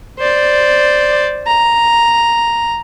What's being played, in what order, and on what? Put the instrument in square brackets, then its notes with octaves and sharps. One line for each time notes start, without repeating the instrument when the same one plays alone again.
[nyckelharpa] C5 D5
A#5